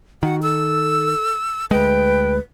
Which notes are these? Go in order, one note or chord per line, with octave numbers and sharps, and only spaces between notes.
D#3 F#4 F#5
A4 E6
D2 G#3 B4 G5